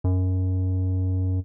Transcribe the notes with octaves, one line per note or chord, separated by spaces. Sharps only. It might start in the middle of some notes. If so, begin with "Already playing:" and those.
F#2